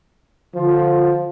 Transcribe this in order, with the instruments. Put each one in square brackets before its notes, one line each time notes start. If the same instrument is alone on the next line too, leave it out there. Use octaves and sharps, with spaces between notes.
[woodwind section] D3 F4 [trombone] F3